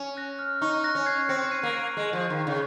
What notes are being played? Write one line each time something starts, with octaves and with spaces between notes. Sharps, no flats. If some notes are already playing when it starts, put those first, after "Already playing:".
Already playing: C#4
F#6 A#6
F6
D#4 C#6
F#6 A#6
C#4
G#6 C7
C4 A#6 C#7
C#7
C7 D#7
A#3
A#6 C#7
G#3
F3
D#3
C#3